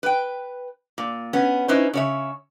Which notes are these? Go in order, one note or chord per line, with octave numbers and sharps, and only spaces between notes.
B4 G5
A#2
B3 C#4
C#4 D#4 E4 B4 C5
C#3 C#5 E5